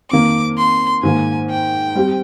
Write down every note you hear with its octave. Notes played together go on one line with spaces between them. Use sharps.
F2 D#3 A#3 D6
C6
G#2 D#3 A#3 G#5
G5
G3 C4 G4